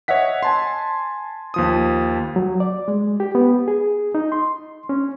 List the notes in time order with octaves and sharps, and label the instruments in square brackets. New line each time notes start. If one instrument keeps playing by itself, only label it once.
[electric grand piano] C#5 D#5 E5 F#5 B6
G#5 A5 C6
D#2 F3 D#6
[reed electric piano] F#3
D5
G#3
G4
B3
G#4
D#4
C6
C#4